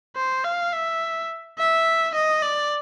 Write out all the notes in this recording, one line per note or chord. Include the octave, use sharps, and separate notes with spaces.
C5
F5
E5
E5
D#5
D5